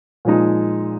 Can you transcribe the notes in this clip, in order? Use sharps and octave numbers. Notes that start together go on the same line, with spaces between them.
A#2 F3 G#3 D#4